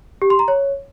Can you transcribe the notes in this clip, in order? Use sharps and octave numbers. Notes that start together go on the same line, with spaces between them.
G4
C6
A#5
C#5